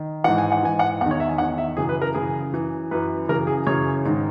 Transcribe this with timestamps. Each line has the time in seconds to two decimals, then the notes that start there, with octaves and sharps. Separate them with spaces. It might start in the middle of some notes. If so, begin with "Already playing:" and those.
Already playing: D#3
0.24 G#2 E3 F#5
0.38 G#5
0.52 F#5
0.63 G#2 E3 G#5
0.79 F#5
1.01 E2 D#3 F#5
1.11 C#5
1.20 E5
1.29 G#5
1.38 E2 D#3 F#5
1.58 E5
1.77 F#2 C#3 E3 G#4
1.89 B4
2.02 A#4
2.14 F#2 C#3 E3 G#4
2.52 F#2 E3
2.91 F#2 E3 B4
3.28 F#2 C#3 E3 A#4
3.47 G#4
3.67 F#2 C#3 E3 C#5
4.05 G#2 D#3